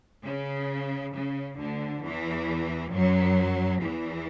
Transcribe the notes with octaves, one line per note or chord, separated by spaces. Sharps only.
C#3
C#3
D2 D3
E2 E3
F#2 F#3
E2 E3